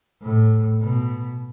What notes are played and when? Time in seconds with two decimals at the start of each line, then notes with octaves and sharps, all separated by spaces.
0.22 A2
0.81 B2